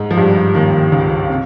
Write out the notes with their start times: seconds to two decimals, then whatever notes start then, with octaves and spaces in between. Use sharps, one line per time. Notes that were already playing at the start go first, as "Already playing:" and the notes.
Already playing: G#2 G#3
0.11 F3
0.17 G2 G3
0.55 D#2 D#3
0.92 C#2 C#3
1.30 C3